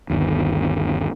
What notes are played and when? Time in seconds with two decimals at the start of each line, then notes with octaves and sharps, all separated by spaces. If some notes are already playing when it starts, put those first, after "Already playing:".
0.10 G1 D#2